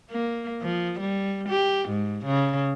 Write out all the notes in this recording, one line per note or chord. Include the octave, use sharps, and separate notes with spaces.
A#3
F3
G3
G4
G#2
C#3